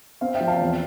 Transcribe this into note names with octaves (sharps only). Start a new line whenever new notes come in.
C4 F5
E5 G5
F3
F5 A5
E2